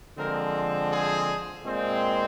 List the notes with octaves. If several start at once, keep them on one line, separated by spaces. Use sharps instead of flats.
D3 F3 G#3 C4 A#4
G#4
A#2 G#3 C4